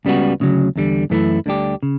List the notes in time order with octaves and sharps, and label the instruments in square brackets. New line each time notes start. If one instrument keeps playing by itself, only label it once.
[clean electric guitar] C#2 C#3 G3 B3 F#4
D2 C#3 F#3
E2 D3 G3
F#2 E3 A3 E4
D2 D3 G3 D4 G4
C#3